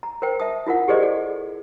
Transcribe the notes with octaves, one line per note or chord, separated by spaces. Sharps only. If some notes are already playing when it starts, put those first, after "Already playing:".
A#5
A#4 C5 G5
E5 A5 D#6
E4 F4 A#4 F#5
G4 G#4 A#4 C5 D5 D#5
A4